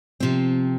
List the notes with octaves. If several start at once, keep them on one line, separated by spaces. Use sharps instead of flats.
C3 F3 C4